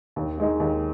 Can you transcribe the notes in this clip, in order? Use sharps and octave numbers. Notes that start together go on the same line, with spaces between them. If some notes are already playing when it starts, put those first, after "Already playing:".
D#2
D#3 G#3 D#4
D#2